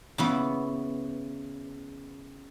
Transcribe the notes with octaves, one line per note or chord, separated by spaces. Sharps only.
C#3 E3 B3